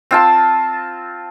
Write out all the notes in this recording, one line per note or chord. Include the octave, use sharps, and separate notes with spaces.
C4 F4 A5